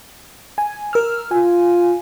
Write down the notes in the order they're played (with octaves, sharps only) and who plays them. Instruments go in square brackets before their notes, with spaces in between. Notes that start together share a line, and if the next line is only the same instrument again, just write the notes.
[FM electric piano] G#5
A#4 E6 F6
[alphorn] F4 [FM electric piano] G#5